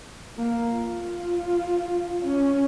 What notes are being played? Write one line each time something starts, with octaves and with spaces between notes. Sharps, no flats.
A#3
F4
C#4